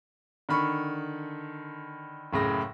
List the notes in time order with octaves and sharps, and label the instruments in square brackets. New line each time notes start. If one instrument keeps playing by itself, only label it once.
[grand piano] D3 D#3 B5 C#6
F#1 A2 C#3 A#6